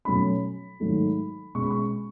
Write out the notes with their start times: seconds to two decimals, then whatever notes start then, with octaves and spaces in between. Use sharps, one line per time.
0.05 B2 F#3 A3 C#4 B5
0.80 G#2 D#3 F#3 A3 D#4
1.55 B2 G#3 C#4 C#6
1.63 B5
1.71 C#6